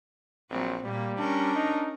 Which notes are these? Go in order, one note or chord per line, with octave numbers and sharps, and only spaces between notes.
A#1 F#3 C4
A#2 G3 A#3
C#4 D4 A#4
D#4